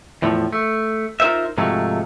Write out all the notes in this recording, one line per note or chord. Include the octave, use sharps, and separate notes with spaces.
E2 A2 F3
A3
D#4 F4 F#4 A#4 C5 E5
G#2 C3 F3 F#3 G#3 A3